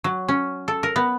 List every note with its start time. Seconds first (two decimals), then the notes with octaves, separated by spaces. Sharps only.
0.04 F#3
0.28 C#4
0.68 A4
0.83 A#4
0.96 B3